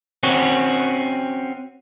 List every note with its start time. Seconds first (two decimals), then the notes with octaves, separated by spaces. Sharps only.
0.23 C4 C#4 F#4